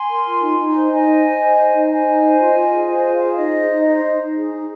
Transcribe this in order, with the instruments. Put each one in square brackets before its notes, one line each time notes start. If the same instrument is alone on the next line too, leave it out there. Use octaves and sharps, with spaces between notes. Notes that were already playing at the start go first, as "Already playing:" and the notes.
Already playing: [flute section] G#5 C6
A#4
F4
D#4
D#4
C5
D#4 D#5 G#5
C5
C5
C5
C5
D#4
C5 D#5 G#5
D#4
C5
F4
F4
G#4
C5 D#5 G#5
F4
F5
G#4
D#4 D#5
C5
D#4
C5 D#5
D#4
D#4
G#4
D#4